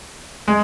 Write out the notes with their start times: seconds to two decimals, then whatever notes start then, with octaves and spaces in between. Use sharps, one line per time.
0.48 G#3